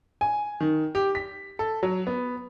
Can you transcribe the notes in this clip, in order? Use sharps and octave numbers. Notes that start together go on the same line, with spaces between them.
G#5
D#3
G4
B6
A4
F#3
B3